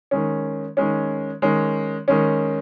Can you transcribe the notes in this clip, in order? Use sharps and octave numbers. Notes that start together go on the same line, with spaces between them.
D#3 G#3 C#4
D#3 G#3 C#4
D#3 G#3 C#4
D#3 G#3 C#4